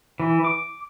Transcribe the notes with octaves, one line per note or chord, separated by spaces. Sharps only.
E3
D6